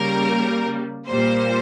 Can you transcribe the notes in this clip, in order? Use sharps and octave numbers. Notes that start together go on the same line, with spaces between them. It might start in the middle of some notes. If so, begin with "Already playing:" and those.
Already playing: C#3 G3 A#3 A#4
A#2 G3 A#3 C5